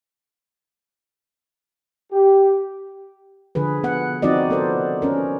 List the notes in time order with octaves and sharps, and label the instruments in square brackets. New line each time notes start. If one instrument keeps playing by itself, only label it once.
[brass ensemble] G4
[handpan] D3 F3 G#4 B4
B3 F#5
F3 C4 D#4 F#4 D5 D#5
B3 A4 A#4 C5
C#4 A#4